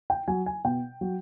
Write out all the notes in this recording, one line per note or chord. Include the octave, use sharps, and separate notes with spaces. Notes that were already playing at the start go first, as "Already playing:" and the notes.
G5
F#3 G#5
G#5
B2 G5
F#3